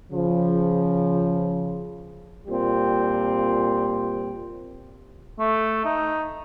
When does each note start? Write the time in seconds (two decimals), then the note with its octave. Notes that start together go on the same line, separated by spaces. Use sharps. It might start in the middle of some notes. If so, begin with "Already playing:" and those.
0.12 C#3 F3
2.47 A#2 G3 C4
5.39 A3
5.85 D#4